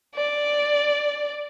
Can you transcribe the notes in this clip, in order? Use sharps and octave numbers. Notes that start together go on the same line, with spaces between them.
D5